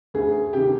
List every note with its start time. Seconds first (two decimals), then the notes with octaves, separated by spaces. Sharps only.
0.14 D2 G#4
0.53 C3 D#3 G4